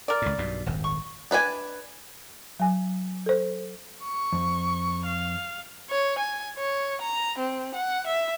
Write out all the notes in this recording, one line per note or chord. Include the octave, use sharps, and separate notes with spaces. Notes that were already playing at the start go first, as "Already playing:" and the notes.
A#4 D5
C#2 A2
B1 G2 B2
D#1 G#1 F2
C#6
D4 B4 D5 G#5
F#3 G#5
A4 C5
C#6
F2
F5
C#5
G#5
C#5
A#5
C4
F#5
E5